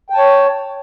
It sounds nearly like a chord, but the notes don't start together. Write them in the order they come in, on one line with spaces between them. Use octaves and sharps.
G5 A5 C#5